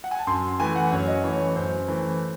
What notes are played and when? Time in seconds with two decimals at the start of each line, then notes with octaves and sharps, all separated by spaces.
0.04 F#5
0.11 G#5
0.19 A5
0.27 F#2 C6
0.59 E3 A3 G#5
0.76 F#5
0.91 F#2 C#5
1.08 D#5
1.24 E3 A3 C#5
1.56 F#2 C5
1.88 E3 A3